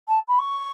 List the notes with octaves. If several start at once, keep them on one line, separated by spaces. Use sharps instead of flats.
A5
B5
C#6